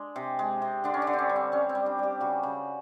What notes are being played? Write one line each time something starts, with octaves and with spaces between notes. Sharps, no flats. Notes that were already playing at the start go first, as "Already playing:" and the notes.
Already playing: G#3 D4
C3
G#3
C3
D3 D4
C#4
D4
D3
C4
C#4
G3
C4
G3 C#4
C4
G3
D4
G3 G4
C#3 F#4
C#3